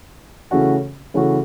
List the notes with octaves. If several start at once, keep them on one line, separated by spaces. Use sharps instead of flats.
C#3 E3 A3 C#4 F#4
C#3 E3 A3 C#4 F#4